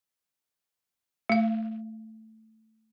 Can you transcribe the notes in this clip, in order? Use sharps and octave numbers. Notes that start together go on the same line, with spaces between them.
A3 F5